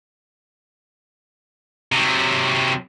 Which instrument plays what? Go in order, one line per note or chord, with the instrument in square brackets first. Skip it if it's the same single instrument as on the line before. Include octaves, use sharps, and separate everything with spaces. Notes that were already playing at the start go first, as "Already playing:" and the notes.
[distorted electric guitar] C3 F#3